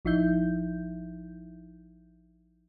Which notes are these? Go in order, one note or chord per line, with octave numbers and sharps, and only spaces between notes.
A1 F3 D#4 E4 E5 G6